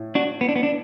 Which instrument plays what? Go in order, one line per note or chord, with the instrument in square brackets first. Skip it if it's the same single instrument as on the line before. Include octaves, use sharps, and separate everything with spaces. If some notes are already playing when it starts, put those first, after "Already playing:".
Already playing: [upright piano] A2
[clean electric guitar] D4 F#4
B3
D4
B3
D4